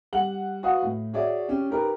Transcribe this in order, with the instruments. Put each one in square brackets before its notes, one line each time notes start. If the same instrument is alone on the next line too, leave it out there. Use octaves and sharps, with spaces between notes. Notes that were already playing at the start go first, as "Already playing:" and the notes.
[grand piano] G3 F#5 F#7
F#4 B4 D#5 F5 F#5 D#6
A2
F#4 G#4 C#5 D5 E5
C#4 G4
D#4 G4 A#4 B4